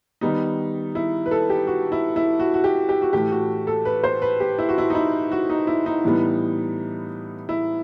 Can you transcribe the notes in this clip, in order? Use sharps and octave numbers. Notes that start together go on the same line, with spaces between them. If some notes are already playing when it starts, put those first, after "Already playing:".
D#3 G3 B3 D#4
E4
B4
A4
G4
F#4
E4
E4
F#4
F#4
G4
G4
F#4
A2 E3 A3 G4
F#4
A4
B4
C5
B4
G4
E4
F#4
E4
D#4
E4
F#4
D#4
E4
D#4
A2 E3 G3 B3
E4